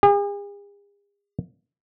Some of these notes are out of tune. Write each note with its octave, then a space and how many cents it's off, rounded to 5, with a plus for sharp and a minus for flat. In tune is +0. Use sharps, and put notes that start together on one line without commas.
G#4 -45